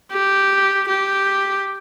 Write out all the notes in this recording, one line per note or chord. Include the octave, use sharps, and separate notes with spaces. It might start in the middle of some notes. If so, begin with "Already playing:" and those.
G4
G4